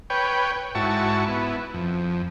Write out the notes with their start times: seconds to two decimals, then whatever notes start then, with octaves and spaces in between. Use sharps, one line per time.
0.10 B4 C#5 G5
0.75 G#2 E4 F#4 A5 C#6
1.28 B3 E4
1.74 F2